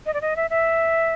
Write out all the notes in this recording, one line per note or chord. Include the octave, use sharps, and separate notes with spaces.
D#5
D5
D#5
E5
E5